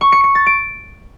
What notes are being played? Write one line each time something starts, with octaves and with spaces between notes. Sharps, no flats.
C#6
C#7
C#7
A6
D7